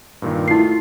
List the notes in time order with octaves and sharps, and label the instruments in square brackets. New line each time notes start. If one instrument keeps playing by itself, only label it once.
[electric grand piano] G2 A#2 D#3
[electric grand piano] A3 F4 [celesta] E4 C7